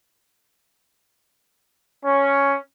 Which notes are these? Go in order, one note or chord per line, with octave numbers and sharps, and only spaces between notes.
C#4